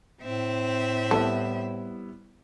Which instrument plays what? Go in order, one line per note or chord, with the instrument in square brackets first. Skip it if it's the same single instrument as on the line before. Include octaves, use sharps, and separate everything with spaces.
[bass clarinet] A2 [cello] C4 E5
[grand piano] G3 B3 E4 [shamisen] A3